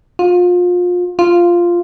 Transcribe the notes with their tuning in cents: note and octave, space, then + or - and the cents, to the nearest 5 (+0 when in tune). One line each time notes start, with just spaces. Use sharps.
F4 +30
F4 -5